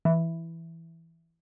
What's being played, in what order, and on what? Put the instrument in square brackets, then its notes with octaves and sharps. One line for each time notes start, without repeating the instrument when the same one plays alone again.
[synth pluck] E3